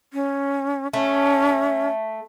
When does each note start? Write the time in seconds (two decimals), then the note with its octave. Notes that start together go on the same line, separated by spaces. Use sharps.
0.13 C#4
0.93 A3 C#4